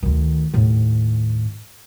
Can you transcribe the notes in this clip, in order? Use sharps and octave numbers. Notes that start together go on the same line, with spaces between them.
D2 D#3
D#2 A2